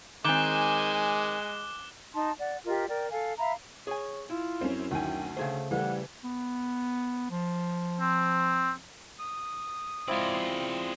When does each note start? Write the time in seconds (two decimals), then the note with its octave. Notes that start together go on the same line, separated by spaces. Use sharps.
0.25 D#3 G#3 C4 G#5 D6 F#6 G7
2.14 D#4 A5 C6
2.40 D5 F#5
2.66 F4 G4 A#4 D#5
2.88 A#4 D5 G5
3.11 A4 F5 G#5
3.38 E5 F5 A#5 B5
3.87 G#4 C#5 G#5
4.30 E4 F4
4.61 F#2 C4 C#4
4.91 D2 D#3 G5 G#5
5.37 C#3 A3 G#4 C5
5.71 E3 G3 A3 F#5
6.24 B3
7.31 F3
8.00 C4
9.20 D#6
10.08 G#3 C4 E4 F4 D5